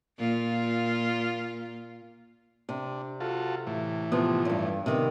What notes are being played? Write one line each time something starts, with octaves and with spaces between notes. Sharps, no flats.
A#2 F4
C3 D4
F4 F#4 A4
A2 E3
C3 F3 B3
E2 G2
C3 D#3 B3